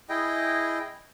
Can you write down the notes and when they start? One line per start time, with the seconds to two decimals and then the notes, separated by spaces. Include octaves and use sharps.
0.09 E4 G#4 D#5 G5